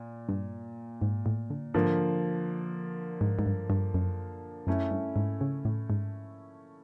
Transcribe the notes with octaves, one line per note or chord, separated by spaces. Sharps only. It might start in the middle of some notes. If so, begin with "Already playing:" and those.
Already playing: A#2
G2
G#2
A2
D3
G#2 D3 F3 A#3
G#2
G#2
G2
G2
F#2
F#2 A3 C#4 E4
G2
G#2
C#3
A2
G#2